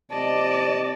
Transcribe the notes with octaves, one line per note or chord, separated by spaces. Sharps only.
C3 D5 D#5 A5